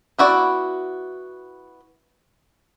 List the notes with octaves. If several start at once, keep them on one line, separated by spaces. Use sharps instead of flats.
B3 E4 F#4 D5